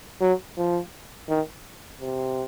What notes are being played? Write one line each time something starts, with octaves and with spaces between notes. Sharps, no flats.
F#3
F3
D#3
C3